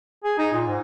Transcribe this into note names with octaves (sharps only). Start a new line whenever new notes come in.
G#4
D#4
A#2
G#2